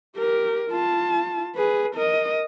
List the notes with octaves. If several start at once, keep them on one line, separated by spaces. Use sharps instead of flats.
G4 A#4
F4 A5
G#4 B4
A#4 D#5